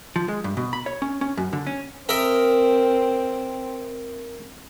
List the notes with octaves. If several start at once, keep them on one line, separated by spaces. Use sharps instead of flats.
F3
G#3
G2
B2
B5
C#5
C#4
C#4
F#2
D3
C#4
C4 A#4 D#5 E5